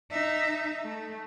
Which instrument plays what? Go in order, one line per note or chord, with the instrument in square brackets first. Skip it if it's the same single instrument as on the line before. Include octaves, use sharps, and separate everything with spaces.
[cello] D#4 E5
A3